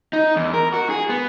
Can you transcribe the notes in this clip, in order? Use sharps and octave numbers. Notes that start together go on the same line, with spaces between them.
D#4
E2
A#4
F#4
G#4
B3